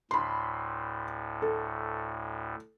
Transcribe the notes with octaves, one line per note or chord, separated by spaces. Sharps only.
D2 A2 B5 C6
A4